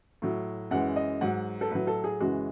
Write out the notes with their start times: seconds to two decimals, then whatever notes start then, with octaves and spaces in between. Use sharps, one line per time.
0.22 A2 F#3
0.71 F#2 E3 G#3 F#5
0.96 D#5
1.21 G#2 F#3 F#5
1.61 A4
1.71 A2 F#3 B4
1.87 A4
2.04 G#4
2.20 F#2 C#3 E3 G#3 F#4